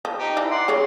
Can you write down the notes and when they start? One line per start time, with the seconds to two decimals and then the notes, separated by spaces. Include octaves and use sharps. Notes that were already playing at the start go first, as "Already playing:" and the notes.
0.05 F3
0.19 D#4 G4
0.37 E3 D4 E4
0.51 D5 F#5 C6
0.68 C#3 F3 C#5